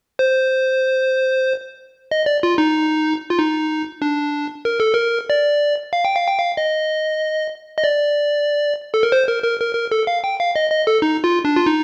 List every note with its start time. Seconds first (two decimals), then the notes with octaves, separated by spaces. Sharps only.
0.19 C5
2.11 D#5
2.26 D5
2.43 F4
2.58 D#4
3.30 F4
3.38 D#4
4.02 D4
4.65 A#4
4.80 A4
4.93 A#4
5.30 D5
5.93 F5
6.05 G5
6.16 F5
6.28 G5
6.39 F5
6.57 D#5
7.78 D#5
7.84 D5
8.94 A4
9.03 A#4
9.12 C5
9.27 A#4
9.44 A#4
9.60 A#4
9.75 A#4
9.91 A4
10.07 F5
10.24 G5
10.40 F5
10.56 D#5
10.71 D#5
10.87 A4
11.02 D#4
11.24 F4
11.45 D4
11.57 F4
11.66 D#4